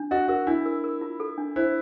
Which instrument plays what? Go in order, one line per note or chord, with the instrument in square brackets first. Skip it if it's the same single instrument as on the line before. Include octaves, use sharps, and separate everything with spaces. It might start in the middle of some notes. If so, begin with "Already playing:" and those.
Already playing: [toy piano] D4
[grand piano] F#4 [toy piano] D#5
[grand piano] F#4 [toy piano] A#4
[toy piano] D4 [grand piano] E4
[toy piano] A#4
A#4
F4
A4
D4
[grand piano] E4 [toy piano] C5